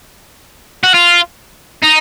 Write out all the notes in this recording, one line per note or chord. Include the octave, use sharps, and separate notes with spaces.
F#4
F4
D#4